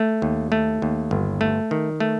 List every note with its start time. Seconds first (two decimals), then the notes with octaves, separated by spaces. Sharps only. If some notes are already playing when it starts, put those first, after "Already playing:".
Already playing: A3
0.22 D#2
0.52 A3
0.82 D#2
1.11 G1
1.41 A3
1.71 D#3
2.00 A3